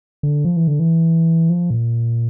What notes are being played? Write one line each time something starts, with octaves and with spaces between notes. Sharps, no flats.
D3
F3
E3
D3
E3
F3
A#2